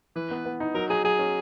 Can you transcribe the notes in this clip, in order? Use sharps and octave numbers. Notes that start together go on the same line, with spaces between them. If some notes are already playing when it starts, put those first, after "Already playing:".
E3 B4
B3
B3
D#4
F#3 A#4
F#3 G#4
F#3 G#4
C#4